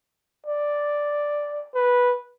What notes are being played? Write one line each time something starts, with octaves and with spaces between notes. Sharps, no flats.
D5
B4